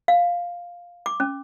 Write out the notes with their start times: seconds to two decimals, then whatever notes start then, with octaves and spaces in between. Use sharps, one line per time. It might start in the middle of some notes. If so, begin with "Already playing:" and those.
0.08 F5
1.06 D6
1.20 C#4